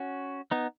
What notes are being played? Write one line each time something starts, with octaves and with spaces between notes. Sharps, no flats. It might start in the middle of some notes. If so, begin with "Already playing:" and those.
Already playing: C#4 F#4
B3 D#4